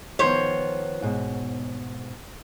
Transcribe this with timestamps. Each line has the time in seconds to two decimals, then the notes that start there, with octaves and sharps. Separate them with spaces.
0.19 D#3 F3 B3 C5 C#5
1.02 G#2 B2